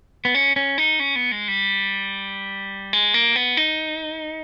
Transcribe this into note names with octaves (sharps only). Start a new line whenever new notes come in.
B3
C#4
C#4
D#4
C#4
B3
G#3
G3
G#3
A#3
B3
D#4